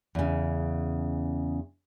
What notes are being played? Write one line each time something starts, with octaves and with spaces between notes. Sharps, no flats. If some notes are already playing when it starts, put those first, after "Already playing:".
E2 C#3